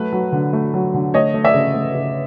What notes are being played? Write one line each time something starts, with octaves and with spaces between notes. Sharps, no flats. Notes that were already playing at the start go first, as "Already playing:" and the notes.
Already playing: F#3 A3 B4
F#3
D3
A3
F#3
D3
A3 C#5 D#5
A3
D5 E5
C#3
A3
C#3